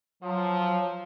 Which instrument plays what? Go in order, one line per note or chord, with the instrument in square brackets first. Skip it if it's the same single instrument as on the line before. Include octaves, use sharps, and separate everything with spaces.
[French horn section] F3 [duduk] F#3